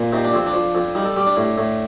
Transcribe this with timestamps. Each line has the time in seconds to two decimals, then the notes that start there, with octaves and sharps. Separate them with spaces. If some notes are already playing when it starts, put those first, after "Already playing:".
Already playing: A#2
0.13 C3 D#4
0.24 D4
0.33 F2 C4
0.46 D4
0.54 F3
0.75 F2
0.95 G3 D#4
1.05 A4
1.17 G3 G4
1.27 D4
1.37 A2
1.58 A2